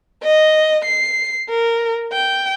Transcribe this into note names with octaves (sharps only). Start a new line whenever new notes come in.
D#5
C7
A#4
G5